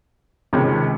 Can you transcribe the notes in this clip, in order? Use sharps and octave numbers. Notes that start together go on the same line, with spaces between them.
C#2 C3 D#3 G#3 C#4